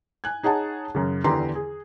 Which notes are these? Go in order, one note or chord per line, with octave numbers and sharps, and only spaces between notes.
G#5 F#6 G#6
D#4 G#4 C#5 F#5 A5
F#2 C#3
E2 D3 G4 B4 A#5 C6
G#4